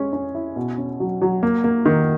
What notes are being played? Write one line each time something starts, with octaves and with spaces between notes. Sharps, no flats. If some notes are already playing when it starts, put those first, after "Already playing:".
Already playing: G#3 C#4
C#4
E4
B2
C#4
F#3
F#3
A#3
A#3
D#3